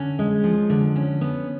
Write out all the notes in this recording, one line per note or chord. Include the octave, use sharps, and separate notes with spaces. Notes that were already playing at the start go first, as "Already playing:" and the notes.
Already playing: D3 C#4
G#3
F3
D3
C#4
B3